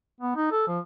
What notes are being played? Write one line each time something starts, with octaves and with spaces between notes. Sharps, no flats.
B3
D#4
A4
F3